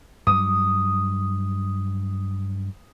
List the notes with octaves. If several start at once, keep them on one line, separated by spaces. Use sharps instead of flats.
G2 F#3 D#6